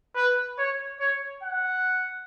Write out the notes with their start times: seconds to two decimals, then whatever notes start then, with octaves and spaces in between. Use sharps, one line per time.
0.15 B4
0.58 C#5
1.00 C#5
1.43 F#5